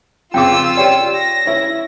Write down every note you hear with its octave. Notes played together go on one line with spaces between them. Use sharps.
F2 C#3 F4 G5 D6 E6
C#4 G4 D5 G5
A#6
C#4 E4